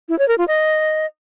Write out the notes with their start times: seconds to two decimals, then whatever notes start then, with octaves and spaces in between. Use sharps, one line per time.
0.09 E4
0.19 C#5
0.28 A#4
0.38 F4
0.48 D#5